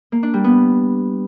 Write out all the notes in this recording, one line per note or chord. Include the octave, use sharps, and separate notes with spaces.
A#3
D4
G3
B3